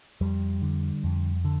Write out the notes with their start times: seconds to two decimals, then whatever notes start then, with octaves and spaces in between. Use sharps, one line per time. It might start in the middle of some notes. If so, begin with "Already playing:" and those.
0.21 F2 G3
0.62 D3
1.04 F2
1.45 D3